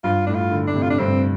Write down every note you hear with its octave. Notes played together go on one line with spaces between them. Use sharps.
G2 F4
A2 D4
F4
D3
A2 D4
C3
F4
D4
G2 C4